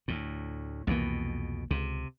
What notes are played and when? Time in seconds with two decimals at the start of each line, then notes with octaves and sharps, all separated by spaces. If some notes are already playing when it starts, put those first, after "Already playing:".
0.08 D2 A2
0.87 C2 F2 B2 E3 A#3
1.71 C#2 C3